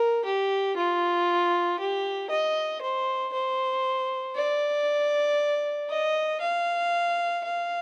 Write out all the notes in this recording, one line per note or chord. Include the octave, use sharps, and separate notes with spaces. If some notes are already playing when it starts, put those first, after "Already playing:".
Already playing: A#4
G4
F4
G4
D#5
C5
C5
D5
D#5
F5
F5